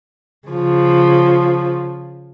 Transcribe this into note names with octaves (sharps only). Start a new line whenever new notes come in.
C#3 F3